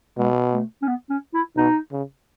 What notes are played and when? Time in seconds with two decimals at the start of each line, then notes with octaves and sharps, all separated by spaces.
0.18 B2 G#3
0.53 A3
0.82 C#4
0.88 B3
1.10 C#4
1.34 E4
1.57 B2 D#4
1.92 C#3